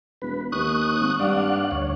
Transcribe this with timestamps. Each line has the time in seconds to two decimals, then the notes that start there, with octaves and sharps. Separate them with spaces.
0.22 E1 B4
0.52 D#2 C#6 D#6 F#6
1.00 G#1
1.19 G2 D5 F5 F#5
1.71 D2 C#5